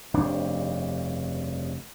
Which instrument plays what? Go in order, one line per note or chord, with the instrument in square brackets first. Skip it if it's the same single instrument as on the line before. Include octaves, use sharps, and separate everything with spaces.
[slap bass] F1 G2 C#3 D4